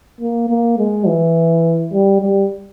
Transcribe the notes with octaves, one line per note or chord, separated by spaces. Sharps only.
A#3
A#3
G#3
E3
G3
G3